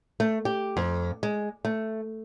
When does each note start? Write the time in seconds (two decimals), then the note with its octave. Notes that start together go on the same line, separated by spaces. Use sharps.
0.20 A3
0.45 G4
0.77 F2
1.23 G#3
1.65 A3